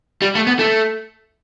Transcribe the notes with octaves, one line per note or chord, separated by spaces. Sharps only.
G3
A3
B3
A3